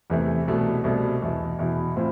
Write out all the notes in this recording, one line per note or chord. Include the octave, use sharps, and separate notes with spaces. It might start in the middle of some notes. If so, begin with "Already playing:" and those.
E2 C3 E3 A3
C2 B2 A3
C2 B2 A3
E2 B2 B3 E4
E2 B2 B3 E4
A2 C4 F4